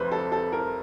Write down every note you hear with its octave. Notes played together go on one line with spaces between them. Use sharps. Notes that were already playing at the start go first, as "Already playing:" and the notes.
Already playing: F1 F2 C3 B4 C5
A4
A4
A#4